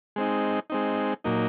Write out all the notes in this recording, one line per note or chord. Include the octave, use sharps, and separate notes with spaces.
G#3 C4 D#4
G#3 C4 D#4
A#2 F#3 A#3 D#4